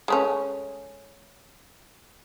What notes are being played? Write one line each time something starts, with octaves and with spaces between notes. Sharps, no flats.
G#3 A3 C#4